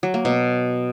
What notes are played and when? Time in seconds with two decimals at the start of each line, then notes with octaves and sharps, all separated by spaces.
0.03 F#3
0.14 A#3
0.25 B2